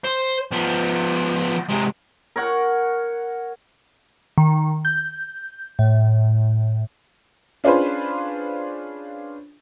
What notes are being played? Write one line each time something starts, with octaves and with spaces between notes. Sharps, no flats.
C5
F3 B3
C3 G#3
A#4 C#5 F#5
D#3
G6
A2
C#4 D4 F4 G#4 B4 C5